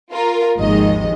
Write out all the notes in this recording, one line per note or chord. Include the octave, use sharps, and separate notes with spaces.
F4 A#4
G#1 D#2 D#3 F3 G#3 D#5